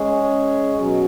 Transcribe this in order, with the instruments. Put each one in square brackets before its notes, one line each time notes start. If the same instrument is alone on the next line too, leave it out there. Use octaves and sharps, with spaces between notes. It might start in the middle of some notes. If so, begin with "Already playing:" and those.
Already playing: [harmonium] G#3 C#4 G#4
B2 F#3 C#4